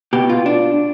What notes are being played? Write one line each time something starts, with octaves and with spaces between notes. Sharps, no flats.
B2 G4
F4
D4